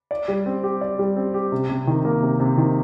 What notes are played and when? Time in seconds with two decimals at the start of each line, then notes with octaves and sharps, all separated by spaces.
0.11 D5
0.28 G3
0.46 C4
0.63 G4
0.81 D5
0.99 G3
1.16 C4
1.34 G4
1.52 C3
1.69 C3
1.87 D#3
2.05 A#3
2.22 C3
2.40 C3
2.58 D#3